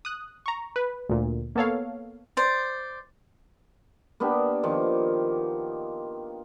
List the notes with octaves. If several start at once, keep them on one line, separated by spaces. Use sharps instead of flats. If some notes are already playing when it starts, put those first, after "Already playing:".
D#6 F#6
A#5 C#6
B4
D2 A#2
A#3 B3 A4 C#5 F5
C5 D5
A#3 B3 D4 G4
D#3 F3